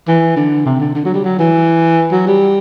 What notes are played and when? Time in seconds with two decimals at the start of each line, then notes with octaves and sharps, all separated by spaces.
0.08 E3
0.36 D3
0.66 C3
0.80 D3
0.95 D3
1.05 F#3
1.14 G3
1.24 F#3
1.38 E3
2.11 F#3
2.27 G3